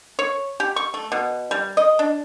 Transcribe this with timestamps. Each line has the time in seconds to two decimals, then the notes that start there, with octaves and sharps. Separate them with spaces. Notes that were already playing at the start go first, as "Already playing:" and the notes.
0.19 C#5
0.60 G4
0.76 C#6
0.94 A3
1.12 B2
1.51 G3
1.77 D#5
1.99 D4